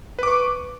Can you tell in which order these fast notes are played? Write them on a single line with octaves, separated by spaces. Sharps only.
B4 D6 C#6